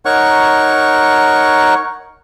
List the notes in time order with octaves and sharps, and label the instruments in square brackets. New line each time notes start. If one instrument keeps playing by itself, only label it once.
[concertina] D#4 A#4 C#5 F#5 C#6